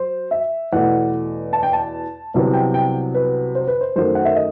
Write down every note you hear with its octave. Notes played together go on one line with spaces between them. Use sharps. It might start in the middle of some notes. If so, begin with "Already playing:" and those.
Already playing: F#3 C5
E5
E2 B2 A3 F#5
A5
G5
A5
C2 C3 F#3 B3
G5
G5
B4
C5
B4
C5
F#2 D#3 F#3 A3 C5
F#5
E5
D#5